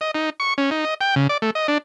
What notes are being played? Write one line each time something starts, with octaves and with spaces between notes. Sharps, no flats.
D#5
D#4
C#6
C#4
D#4
D#5
G5
C#3
D5
A3
D#5
D4